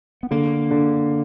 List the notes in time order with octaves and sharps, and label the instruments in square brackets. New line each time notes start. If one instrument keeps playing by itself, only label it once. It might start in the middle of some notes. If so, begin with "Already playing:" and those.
[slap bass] B3
[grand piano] D3 [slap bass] A#3
[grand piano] D3